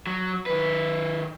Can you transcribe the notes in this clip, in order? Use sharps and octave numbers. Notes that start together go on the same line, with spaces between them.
F#3
D#3 B4